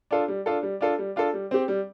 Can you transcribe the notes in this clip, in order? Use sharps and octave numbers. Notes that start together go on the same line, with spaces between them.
D4 F4 A4
G3
D4 F4 A4
G3
D4 F4 A4
G3
D4 F4 A4
G3
C4 G4
G3